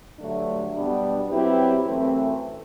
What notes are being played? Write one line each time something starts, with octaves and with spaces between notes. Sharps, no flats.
G2 D3 F#3 A3 D4
B2 G3 B3 D4
F#3 C4 E4 G4 B4
F#2 E3 A3 C4